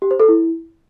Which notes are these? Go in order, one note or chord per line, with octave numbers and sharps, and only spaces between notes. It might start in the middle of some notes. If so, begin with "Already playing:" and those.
G4
C5
A4
E4